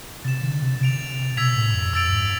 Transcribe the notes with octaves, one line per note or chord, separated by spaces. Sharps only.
C3 A6 E7
D3
C3
C3 A6 D7 F7
B2 E6 G#6 B6 F7
A2
F2
F2 E6 A6 D7 F7
G#2